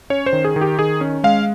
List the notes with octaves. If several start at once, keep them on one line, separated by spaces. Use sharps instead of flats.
C#4 C#5
C5
D#3
G#4
D#3
G4
D#3 G#4
C#4
G#3 F5